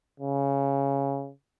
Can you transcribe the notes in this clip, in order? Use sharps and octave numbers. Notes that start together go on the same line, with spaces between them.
C#3